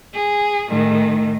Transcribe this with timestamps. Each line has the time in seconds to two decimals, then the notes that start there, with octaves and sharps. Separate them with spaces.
0.14 G#4
0.68 A2 D#3